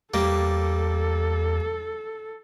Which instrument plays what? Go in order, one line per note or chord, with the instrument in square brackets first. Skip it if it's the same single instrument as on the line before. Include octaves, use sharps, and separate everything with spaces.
[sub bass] E2 [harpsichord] G3 A#3 [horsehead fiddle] A4